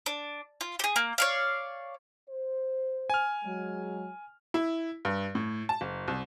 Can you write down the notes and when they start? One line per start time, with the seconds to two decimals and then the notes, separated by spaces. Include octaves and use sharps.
0.06 D4
0.61 F4
0.79 G4 G#4
0.96 A#3
1.18 C#5 D5 F5
2.29 C5
3.10 G#5 F6
3.44 F#3 G#3
4.54 E4
5.05 G2
5.35 A2
5.69 A5
5.81 F#1
6.08 C2